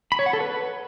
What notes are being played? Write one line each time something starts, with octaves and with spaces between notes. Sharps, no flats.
B5
C#5
F#5
A4
B4